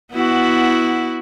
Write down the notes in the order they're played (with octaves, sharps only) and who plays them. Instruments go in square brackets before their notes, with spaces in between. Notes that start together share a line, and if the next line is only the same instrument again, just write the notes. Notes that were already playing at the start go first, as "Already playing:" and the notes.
[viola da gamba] B3 E4 F#4